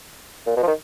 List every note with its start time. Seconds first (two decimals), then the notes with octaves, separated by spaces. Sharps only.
0.47 A#2
0.57 B2
0.63 F3
0.67 D#3